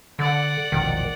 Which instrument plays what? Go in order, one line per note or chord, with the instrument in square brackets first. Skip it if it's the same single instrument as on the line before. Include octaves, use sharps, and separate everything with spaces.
[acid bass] D3 [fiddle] D5 F#5
[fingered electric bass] E1 A#1 [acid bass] D#3